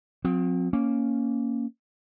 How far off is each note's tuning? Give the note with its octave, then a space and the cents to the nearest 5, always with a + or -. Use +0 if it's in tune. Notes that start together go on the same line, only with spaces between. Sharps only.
F3 +45 C4 +0
A#3 +0 C#4 +0